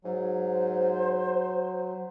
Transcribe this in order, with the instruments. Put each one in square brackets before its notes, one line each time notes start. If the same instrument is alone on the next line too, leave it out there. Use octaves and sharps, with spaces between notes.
[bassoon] G#2 [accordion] F#3
[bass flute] C5